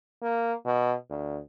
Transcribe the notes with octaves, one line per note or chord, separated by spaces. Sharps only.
A#3
B2
D2